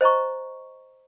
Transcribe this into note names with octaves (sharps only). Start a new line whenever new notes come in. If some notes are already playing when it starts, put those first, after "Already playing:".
C5 D#5 A#5 C#6